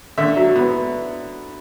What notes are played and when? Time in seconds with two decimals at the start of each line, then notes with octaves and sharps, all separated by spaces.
0.18 D3 E5
0.36 F#3
0.56 B3